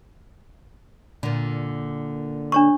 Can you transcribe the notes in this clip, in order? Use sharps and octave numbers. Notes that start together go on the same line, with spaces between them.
A#2 D3
D4 C#5 C#6